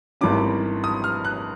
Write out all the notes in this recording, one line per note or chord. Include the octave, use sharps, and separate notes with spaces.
G#1 G2 E3 A3 C#4 D6
D#6
F6
F#6